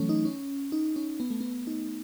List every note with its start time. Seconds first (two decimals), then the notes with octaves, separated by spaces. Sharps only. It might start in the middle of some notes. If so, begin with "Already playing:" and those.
Already playing: E3 F#3 A3 C#4
0.09 D#4
0.25 C#4
0.72 D#4
0.96 C#4
1.20 B3
1.30 A3
1.41 B3
1.67 D#4